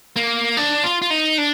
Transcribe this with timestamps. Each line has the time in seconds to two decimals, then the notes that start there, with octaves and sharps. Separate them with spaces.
0.16 A#3
0.57 D4
0.84 F4
1.02 F4
1.10 D#4
1.38 D4